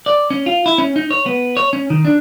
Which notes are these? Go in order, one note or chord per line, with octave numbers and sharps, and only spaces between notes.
D5
C#4
F4
E4
C#4
D#4
C#5
B3
C#5
C#4
D#3
D4